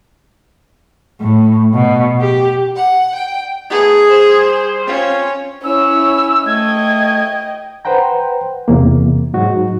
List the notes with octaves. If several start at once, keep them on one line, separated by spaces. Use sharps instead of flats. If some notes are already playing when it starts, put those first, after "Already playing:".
A2
B2
G4
F#5
G5
A3 B3 D#4 G#4
G3 C5
C4 C#4 F4
C#4 E4 C#5 E6
A3 D#5 G5 G#6
B4 C5 F#5 G5 A#5
E2 C3 A#3
G#2 F#3 D#4 F#4